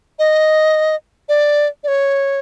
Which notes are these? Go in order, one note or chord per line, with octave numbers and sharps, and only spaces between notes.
D#5
D5
D5
C#5